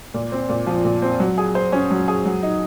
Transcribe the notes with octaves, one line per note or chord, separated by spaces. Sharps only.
A#2
C4
A#2
F3
A#2
C4
F#3
G#4
C5
C#4
F#3
G#4
F#3
D#4